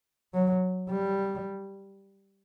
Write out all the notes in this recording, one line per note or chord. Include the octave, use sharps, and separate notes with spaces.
F#3
G3